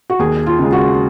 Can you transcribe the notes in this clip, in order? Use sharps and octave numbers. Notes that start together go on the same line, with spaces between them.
F#4
D#2 G#4
F4
C#3 G#3
F#4